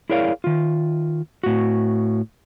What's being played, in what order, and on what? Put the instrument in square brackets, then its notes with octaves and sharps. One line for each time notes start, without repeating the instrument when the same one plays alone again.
[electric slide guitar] E4 G#4 A#4 C#5 D5 F5
D#3 F4
A2 F#4